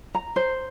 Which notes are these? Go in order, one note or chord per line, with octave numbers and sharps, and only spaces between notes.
A#5
C5